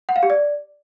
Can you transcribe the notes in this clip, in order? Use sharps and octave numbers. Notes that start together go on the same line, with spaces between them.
F#5
F5
G4
D5